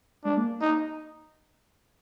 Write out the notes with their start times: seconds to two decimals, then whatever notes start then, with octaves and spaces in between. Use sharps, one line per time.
0.24 G#3 D4
0.37 A#3
0.61 D#4